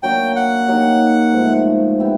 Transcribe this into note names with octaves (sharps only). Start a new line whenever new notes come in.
F#3 A#3 D4 F#4 G5
F#5
F#3 A#3 D#4 G4
G#2 F3 A3
B3 E4 G4